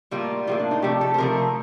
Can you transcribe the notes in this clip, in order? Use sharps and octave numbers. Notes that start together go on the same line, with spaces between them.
A2 G3 A#3 F4
A2 G3 A#3 F4
D4
D#4
C3 F3 A3 G4
A4
C5
C3 F3 A3 A#4